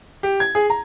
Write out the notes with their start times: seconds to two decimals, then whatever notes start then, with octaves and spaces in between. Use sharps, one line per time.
0.23 G4
0.40 G#6
0.55 G#4
0.70 A#5